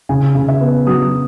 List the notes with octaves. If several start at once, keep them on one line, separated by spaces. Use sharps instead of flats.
C#3 G#5
C#3
E5
B3
F#3 D#6